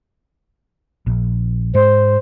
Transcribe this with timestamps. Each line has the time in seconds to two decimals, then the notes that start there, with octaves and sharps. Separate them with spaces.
1.06 A#1
1.75 G#2 G#3 C5